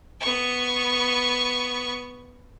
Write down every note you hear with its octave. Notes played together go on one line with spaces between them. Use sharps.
B3 C#6